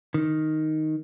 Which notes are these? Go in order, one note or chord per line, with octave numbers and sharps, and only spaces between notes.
D#3